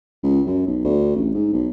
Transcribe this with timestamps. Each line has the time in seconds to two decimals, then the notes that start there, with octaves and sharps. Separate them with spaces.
0.23 C#2
0.47 F#2
0.67 B1
0.84 D2
1.16 A1
1.34 G#2
1.53 B1